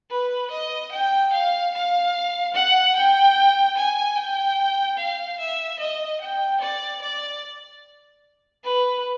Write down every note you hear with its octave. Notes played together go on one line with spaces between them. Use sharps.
B4
D#5
G5
F5
F5
F#5
G5
G#5
G5
F5
E5
D#5
G5
D5
D5
B4